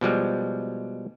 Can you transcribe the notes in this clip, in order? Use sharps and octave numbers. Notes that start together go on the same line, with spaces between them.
B2 F3 G3 G#3